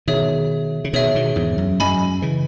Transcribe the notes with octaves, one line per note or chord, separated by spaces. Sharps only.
B2 D#3 G#4 C#5 E5
C#3
B2 D#3 G#4 C#5 E5
B2 D#3
E2 G#2
F#2
F#2 D#5 G#5 B5
C#3 E3